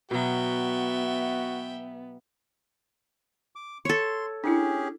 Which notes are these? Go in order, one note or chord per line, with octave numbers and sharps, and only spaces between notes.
B2 F#3 B3 F#4 E5 G5
D6
A4 C#5 C6
C#4 D4 E4 G4 G#4